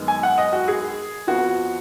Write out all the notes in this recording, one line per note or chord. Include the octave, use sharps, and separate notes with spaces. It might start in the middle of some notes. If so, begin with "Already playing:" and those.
Already playing: F#2 D#3 G#3 B3
G#5
F#5
D#5
F#4
G#4
F2 F3 B3 F#4